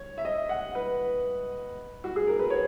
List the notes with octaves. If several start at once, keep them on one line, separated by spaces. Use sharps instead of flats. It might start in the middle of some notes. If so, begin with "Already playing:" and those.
Already playing: C#5
E5
D#5
F#5
B4
F#4
G#4
A#4
B4
C#5